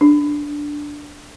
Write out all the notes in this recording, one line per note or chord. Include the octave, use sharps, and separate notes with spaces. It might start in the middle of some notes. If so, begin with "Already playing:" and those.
D4